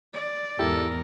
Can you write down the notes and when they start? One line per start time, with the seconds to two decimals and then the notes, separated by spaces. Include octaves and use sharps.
0.13 D5
0.59 E2 G#2 E4 G4 A4 A#4